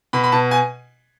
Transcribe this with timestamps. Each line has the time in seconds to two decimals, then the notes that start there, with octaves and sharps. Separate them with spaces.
0.13 B2 B5
0.24 B5
0.32 B2 A5
0.51 G#5